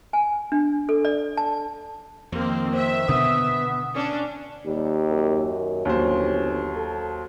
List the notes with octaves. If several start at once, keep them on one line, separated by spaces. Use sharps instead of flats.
G#5
D4
A4
D5
A5
F2 D#3 F3 A#3 C4
C5 E5
B2 D3 D#3 B3 D#6
C#4 D4
D#2 G3
F#2
G1 D#2 F#3 C#4 C5
A4